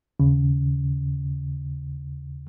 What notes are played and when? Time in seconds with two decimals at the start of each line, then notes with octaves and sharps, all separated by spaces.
0.20 D#2 C#3